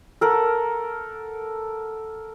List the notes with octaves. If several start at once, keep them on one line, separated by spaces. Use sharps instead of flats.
A4 A#4 F#5